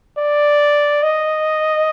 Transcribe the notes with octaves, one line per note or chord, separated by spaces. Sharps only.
D5
D#5